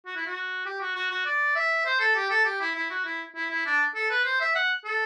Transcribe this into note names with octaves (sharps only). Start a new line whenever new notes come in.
F#4
E4
F#4
G4
F#4
F#4
F#4
D5
E5
C5
A4
G4
A4
G4
E4
E4
F#4
E4
E4
E4
D4
A4
B4
C5
E5
F#5
A4